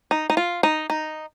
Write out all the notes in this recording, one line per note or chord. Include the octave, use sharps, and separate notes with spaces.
D#4
D#4
F4
D#4
D#4